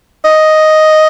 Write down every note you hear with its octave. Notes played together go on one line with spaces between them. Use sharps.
D#5